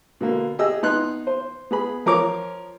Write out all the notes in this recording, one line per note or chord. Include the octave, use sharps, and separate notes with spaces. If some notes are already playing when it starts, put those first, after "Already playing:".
B2 D3 A#3
G4 G#4 D#5 E6
B3 D#4 C6 F#6
C5
B3 G#4 B5
F3 A#4 C#5 D6